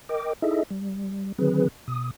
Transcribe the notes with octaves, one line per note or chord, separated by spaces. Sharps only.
A#4 D#5 G5 D6
D#4 E4 G#4 A4 D#5 E5
G3
D3 D#3 F#3 C4 G#4 B4
B2 D#6